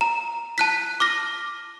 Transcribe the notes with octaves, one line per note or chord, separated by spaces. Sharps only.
A#5
A5 F#6 B6
D6 F6 A#6